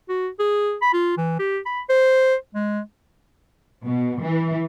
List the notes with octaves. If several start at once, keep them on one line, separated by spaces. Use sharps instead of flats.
F#4
G#4
B5
F4
E3
G4
B5
C5
G#3
B2
E3